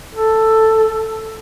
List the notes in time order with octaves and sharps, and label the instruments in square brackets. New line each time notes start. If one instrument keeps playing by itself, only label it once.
[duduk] A4